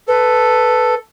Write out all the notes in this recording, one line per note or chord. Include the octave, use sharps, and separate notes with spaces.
A4 B4